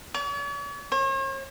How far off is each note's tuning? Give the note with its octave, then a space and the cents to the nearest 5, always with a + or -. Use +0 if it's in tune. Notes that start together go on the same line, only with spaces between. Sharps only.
C#5 +45
C#5 -45